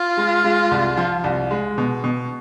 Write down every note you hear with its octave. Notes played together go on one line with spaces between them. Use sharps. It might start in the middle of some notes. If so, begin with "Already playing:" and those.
Already playing: F4
G#3
G#3
C2
F3
C2
G#3
B2
B2